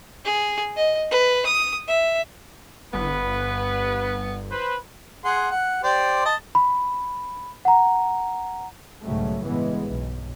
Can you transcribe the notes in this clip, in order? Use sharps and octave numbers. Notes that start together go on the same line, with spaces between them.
G#4
D#5
B4
D#6
E5
G1 B3 B4
B4 C5
G#4 F#5 C6
F#5
G4 C5 D5
D#5 A5
B5
F#5 A#5
B1 G#2 C#3 F#3 G3 A3
A1 G2 E3 G#3 B3
B1